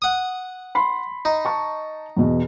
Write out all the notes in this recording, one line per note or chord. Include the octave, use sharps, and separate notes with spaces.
F#5 D#6
B5 C6
D#4
A5 C#6
E2 B2